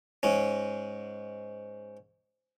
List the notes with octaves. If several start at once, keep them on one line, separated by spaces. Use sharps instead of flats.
G#2 C#4